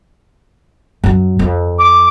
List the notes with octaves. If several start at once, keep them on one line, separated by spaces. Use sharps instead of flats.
F#2 F#3
F2
D6